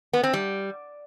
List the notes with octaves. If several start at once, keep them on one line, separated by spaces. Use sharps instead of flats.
B3
C4
G3